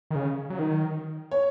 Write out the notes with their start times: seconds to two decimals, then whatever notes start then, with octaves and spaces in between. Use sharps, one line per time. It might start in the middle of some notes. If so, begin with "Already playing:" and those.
0.11 D#3
0.15 C#3
0.50 F#3
0.59 D#3
1.31 C#5